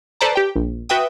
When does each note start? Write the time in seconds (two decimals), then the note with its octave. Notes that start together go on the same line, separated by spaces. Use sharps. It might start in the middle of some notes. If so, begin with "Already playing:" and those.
0.21 A4 B4 C5 D5 A5 A#5
0.35 G4 G5
0.55 A#1
0.89 F#4 B4 E5 G5 D#6